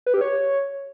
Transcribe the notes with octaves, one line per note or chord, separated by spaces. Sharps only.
B4
G4
C#5